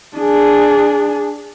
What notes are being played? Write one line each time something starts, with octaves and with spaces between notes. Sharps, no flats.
D4 G#4